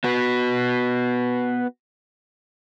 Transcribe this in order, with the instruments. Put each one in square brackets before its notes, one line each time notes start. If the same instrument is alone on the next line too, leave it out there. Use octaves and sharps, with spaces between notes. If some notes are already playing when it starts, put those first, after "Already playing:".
[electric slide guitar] B3 F#4 B4